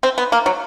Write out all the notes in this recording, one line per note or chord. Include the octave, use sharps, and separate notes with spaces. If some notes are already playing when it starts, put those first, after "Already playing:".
C4
B3
A#3
F#3